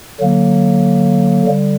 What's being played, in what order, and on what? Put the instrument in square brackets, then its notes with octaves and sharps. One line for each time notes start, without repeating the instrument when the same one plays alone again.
[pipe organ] D3 F#3 A#3
D3 G3